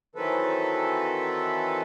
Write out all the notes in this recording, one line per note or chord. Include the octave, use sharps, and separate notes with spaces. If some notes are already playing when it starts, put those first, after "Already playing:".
D#3 E3 F#3 C4 A4 B4